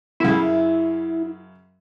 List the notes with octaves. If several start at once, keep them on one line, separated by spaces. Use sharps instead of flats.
F#2 C#3 E4